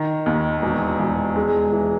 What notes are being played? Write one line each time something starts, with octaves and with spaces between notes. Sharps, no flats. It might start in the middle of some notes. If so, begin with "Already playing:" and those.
Already playing: D#3
D#2
E1
E1
G#3
E3